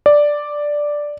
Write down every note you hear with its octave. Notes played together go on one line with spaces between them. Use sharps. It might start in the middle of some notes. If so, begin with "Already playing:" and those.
D5